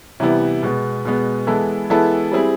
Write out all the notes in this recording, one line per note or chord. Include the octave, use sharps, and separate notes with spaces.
C3 E3 G3 B3 E4
B2 G#3 B3
B2 G#3 B3
E3 G#3 B3 E4 A4
E3 G#3 B3 E4 A4
G3 C4 E4 G#4